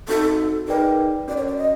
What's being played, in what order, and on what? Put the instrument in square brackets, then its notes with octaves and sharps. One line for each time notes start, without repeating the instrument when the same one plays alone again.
[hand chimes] C4 D#4 F#4 [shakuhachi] A4
[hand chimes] D#4 G#4 B4 D5 G5 [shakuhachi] A#4
[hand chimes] C#4 F#4 A#4 [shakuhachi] D5
[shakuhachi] C#5
D5
D#5